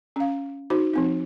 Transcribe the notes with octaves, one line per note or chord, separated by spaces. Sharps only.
C#4 F5
D#4 F#4 C5
F3 C4 D#4